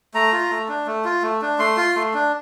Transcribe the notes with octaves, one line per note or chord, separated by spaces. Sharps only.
A3 A#5
F4
A3
D4
A3
F4
A3
D4
A3 C6
F4
A3
D4